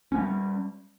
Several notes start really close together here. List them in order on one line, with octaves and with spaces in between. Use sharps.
C#4 B3 G3